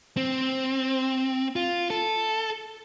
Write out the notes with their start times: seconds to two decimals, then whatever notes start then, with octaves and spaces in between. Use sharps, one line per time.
0.17 C4
1.56 F4
1.90 A4